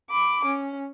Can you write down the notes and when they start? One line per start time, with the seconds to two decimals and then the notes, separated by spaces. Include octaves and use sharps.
0.11 B5 D6
0.45 C#4